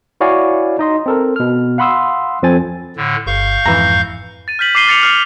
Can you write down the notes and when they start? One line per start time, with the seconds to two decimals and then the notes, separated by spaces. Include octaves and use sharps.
0.21 E4 F#4 C#5 D5 F5 G#5
0.79 D#4 D#5 C6
1.06 C4 A4 A#4
1.36 B2 F6
1.78 F5 F#5 B5 C6 D#6 E6
2.43 F2 F3 C4 A4 G#5 A6
2.96 A2 D3
3.27 G1 F5 C#6 G6
3.66 F2 G#2 E3 A#5
4.48 A6 D#7
4.59 F6 G6 B6 F#7
4.75 D6 B6 C7 D#7 G7
4.87 F6 A6 C#7 F7
5.03 F6 C7